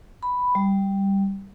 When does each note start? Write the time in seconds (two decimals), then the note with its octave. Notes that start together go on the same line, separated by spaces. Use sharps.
0.23 B5
0.55 G3